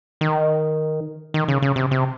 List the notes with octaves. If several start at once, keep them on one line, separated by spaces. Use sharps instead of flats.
D#3
D#3
C#3
C#3
C3
C3